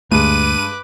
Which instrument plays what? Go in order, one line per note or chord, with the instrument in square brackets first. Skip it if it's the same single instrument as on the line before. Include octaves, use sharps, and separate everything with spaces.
[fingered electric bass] D2 A3 [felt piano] G2 G#3 [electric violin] B4 D6 [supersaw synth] D#7